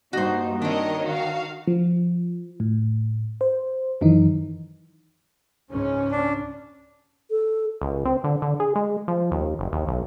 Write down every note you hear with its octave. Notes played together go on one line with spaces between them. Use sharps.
G2 A#3 D#4 F#4 C5
D#3 C4 D4 A#4 C#5 D#5
F#4 F5
F3
A2
C5
F#2 D#3 E3 D#4
C#2 G#2 C#4
D4
A4
C#2
C4
D3
D3
G#4
G#3
F3
D#2
F#1
D#2
B1